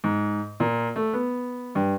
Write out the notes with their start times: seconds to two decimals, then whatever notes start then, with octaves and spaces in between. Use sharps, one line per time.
0.04 G#2
0.60 A#2
0.96 A3
1.13 B3
1.75 G2